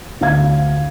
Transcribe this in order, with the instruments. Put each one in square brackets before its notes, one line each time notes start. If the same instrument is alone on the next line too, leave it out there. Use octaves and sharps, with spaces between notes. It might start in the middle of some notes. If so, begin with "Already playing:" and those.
[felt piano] D2 D4 F5 G#6